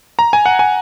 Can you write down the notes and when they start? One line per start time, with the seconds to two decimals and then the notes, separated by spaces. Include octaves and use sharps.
0.19 A#5
0.33 G#5
0.46 F#5
0.59 G#5